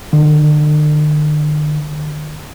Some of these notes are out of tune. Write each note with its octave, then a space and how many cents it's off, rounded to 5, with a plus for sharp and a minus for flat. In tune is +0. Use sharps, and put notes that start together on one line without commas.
D3 +45